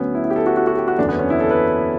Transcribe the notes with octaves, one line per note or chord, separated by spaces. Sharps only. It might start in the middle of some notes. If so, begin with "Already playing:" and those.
Already playing: D2 D3 F#3 B3 C#4
E4
E4
G4
A4
F#4
F#4
F#4
G4
F#4
F#1 E2 D3 F#3 D4
B3
C#4
E4
A4
B4